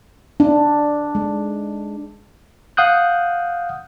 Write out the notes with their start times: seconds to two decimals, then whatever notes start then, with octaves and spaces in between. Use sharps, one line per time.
0.40 D4
1.15 G#3
2.77 F5 F#5 D#6 F#6 G6